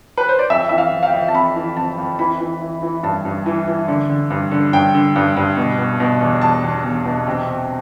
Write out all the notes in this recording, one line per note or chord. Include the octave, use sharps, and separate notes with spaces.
B4
C5
D5
F2 E5
E3 E5
F5
F2
F5
G5
F2
A5
F2 B5
E3
F2 A5
F2
E3 B5
E3
E3
E3
G2 A5
G2
E3
E3
D3
D3
G2
D3
G2 G5
D3
G2
G2
B2
B2
B2
E2
E2 A5
E2
E2
B2
C3
C3